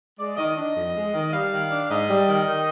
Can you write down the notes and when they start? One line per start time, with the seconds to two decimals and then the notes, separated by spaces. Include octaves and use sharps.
0.19 G#3 D5
0.37 D#3 D#5
0.56 D4 D#5
0.75 F2
0.95 G#3
1.13 D#3
1.32 G3 F5
1.51 D#3
1.71 D4
1.89 G#2 D#5
2.09 G3
2.27 D#3
2.46 D#3